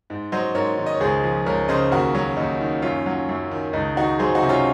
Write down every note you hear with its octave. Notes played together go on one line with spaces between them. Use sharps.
G#2
F#3 C5 D#5
G#2 A#4 C#5
D#3
D#5
C#5
C#2 G#4 C5
F3
C#2 A#4 C#5
C#3 C5 D#5
D#2 F#4 A#4
F#3 C#4
D#2 D#4
D#3
F#2 C#4 F4
F#3
F#2
D#3
C#2 D#4
D#3 D#4 F#4
F#3 G#4 C5
D#4 F#4
C3
C#4 F4